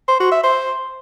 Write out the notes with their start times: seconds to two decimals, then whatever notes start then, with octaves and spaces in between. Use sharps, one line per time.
0.08 C5
0.20 F#4
0.32 E5
0.44 C5